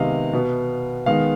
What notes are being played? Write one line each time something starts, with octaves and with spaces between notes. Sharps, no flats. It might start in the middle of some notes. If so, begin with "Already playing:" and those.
Already playing: C3 D#3 G#3 B3 D#5 F5
B2 B3
D#3 G#3 B3 F5